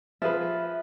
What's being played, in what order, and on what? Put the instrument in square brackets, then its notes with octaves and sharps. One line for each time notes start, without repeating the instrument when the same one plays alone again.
[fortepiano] F3 G#4 B4 [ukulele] E5